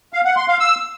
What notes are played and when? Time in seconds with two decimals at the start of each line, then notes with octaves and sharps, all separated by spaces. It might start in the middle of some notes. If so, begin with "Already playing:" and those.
0.13 F5
0.25 F#5
0.37 C6
0.48 F5
0.60 E6